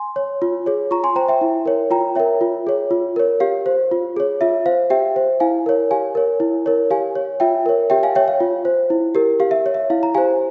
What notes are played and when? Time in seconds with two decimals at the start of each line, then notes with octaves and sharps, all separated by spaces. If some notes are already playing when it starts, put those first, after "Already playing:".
Already playing: G#5 C6
0.16 C#5
0.42 F4
0.66 G#4 C#5
0.91 F4 A#5 C#6
1.04 G#5 C6
1.16 C5 G5 A#5
1.28 E5 G5
1.41 E4
1.66 A#4 C#5
1.91 F4 G5 A#5
2.15 A#4 C#5 E5 G5
2.41 F4
2.67 G#4 C#5
2.91 F4
3.16 A#4 C#5
3.40 G4 F5
3.66 C5
3.91 F4
4.16 G#4 C#5
4.41 F4 E5
4.66 C5 F5
4.90 G4 E5 G5
5.16 C5
5.40 E4 F5 G#5
5.66 A#4 C#5
5.91 G4 F5 G#5
6.15 A#4 C#5
6.40 E4
6.66 A#4 C#5
6.91 G4 F5 G#5
7.16 C#5
7.40 F4 E5 G5
7.66 A#4 C#5
7.90 G4 E5 G5
8.03 F5 G#5
8.15 C#5 E5 G5
8.28 F5
8.40 F4
8.65 C5
8.90 E4
9.15 G4 A#4
9.40 G4 F5
9.51 E5
9.66 C#5
9.74 E5
9.90 E4 F5
10.03 A#5
10.15 G4 C5 F5 G#5